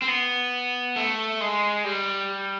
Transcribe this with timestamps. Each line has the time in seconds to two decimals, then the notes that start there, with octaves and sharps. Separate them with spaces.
0.02 C4
0.08 B3
0.96 A3
1.41 G#3
1.84 G3